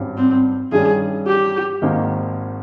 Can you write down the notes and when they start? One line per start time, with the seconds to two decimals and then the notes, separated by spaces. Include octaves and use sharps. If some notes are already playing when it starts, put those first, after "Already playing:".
Already playing: G#1 G2 G3 C#4
0.17 C4
0.72 G2 D#3 G3 C#4 G#4
1.27 G4
1.82 G#1 G#2 D#3 A#3 D#4